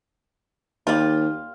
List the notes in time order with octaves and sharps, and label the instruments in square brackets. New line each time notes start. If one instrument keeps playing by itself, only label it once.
[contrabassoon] D#2 [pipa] G3 F4